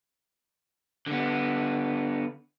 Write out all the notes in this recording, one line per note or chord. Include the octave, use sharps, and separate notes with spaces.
D3 B3